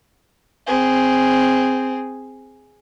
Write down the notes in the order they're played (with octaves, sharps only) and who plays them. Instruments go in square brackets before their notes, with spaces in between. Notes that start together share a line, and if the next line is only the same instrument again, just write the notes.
[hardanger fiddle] C4 G#4